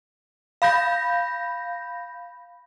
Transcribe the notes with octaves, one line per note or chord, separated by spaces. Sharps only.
F5 B5 G6 A#6